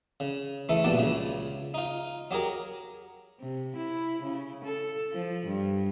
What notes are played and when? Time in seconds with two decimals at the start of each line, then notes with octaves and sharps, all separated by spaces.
0.20 C#3
0.69 E3 G#3 A3 A4
0.84 A#1 G2 B2 D5 A5
0.99 C#2 C#3
1.74 D#4 F4
2.31 F#3 G4 G#4 A#4
3.40 C3
3.76 E4
4.23 C#3
4.65 A4
5.13 F3
5.47 G2